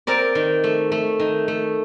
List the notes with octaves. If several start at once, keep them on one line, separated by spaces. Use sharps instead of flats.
C4 A#4 D5
D#3
A3
A3
D#3
A3